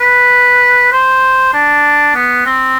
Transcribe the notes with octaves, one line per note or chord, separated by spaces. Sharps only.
B4
C5
D4
B3
C4